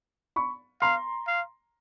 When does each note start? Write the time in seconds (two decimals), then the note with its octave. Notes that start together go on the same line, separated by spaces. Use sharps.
0.36 B5 C#6
0.81 F5 A#5 C6
1.28 F5